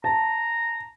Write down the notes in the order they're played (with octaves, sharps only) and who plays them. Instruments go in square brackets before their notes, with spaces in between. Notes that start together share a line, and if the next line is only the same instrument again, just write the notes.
[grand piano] A5 [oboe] A#5